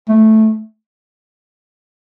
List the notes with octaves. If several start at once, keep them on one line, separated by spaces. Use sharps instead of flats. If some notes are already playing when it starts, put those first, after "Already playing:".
A3